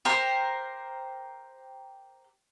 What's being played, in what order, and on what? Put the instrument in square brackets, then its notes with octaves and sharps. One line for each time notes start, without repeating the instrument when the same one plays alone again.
[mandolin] G4 A#4 C5